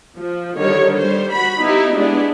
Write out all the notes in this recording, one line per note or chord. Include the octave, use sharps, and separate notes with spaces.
F3
D3 D#3 G3 C#5
G3 C5
F#4 B5
B3 D#4 E4 G4
G#3 B3 D4 E4 D5